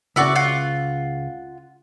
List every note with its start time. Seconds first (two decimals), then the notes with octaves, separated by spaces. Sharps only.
0.16 C#2 A2 C#3 E4 F#4 D5
0.36 F4 F#5